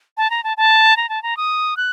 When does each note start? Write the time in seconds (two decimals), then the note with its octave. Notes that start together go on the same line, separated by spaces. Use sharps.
0.17 A5
0.30 A#5
0.44 A5
0.57 A5
0.97 A#5
1.09 A5
1.23 A#5
1.37 D#6
1.77 F#6